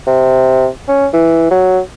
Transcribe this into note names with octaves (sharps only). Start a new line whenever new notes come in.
C3
C#4
E3
F#3